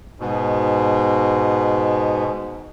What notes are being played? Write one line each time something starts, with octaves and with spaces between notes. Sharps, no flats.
G#2 B2